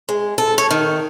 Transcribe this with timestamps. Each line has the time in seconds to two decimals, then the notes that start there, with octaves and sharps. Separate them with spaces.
0.09 G#3
0.38 A4
0.58 C#5
0.70 D#3